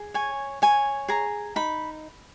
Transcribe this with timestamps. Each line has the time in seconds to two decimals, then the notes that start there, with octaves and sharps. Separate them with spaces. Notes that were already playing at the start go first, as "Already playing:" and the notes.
Already playing: G#4
0.14 C#5 G#5
0.62 C#5 G#5
1.08 G#4 A#5
1.56 D#4 B5